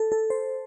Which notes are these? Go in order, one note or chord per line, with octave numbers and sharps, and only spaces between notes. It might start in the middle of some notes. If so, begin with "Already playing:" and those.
Already playing: A4
A4
C5